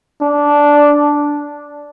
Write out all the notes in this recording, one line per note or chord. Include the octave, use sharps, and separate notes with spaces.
D4